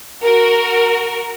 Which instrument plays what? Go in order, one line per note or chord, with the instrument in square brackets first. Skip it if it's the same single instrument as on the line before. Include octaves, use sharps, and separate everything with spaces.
[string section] F#4 A#4